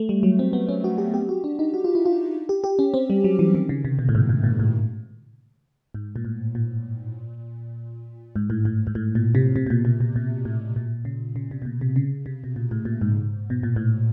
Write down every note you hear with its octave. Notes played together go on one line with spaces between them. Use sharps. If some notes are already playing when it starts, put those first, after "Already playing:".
Already playing: A3
G3
F#3
C4
B3
C#4
F#4
G4
G4
F#4
D4
D#4
F#4
F4
E4
F4
G4
G4
C#4
C4
G3
F#3
E3
D#3
C#3
C3
B2
A2
G#2
A2
A#2
A2
G#2
A#2
A2
A#2
G#2
A2
A2
G#2
A2
A#2
C3
C3
B2
A#2
A#2
B2
A#2
A2
A#2
C#3
C#3
C3
B2
A#2
C3
C#3
C3
B2
A#2
A2
A#2
G#2
B2
A#2
A2